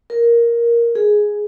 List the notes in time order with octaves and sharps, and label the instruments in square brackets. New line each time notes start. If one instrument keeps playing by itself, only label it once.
[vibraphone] A#4
G#4